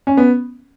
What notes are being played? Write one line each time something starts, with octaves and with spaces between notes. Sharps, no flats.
C#4
B3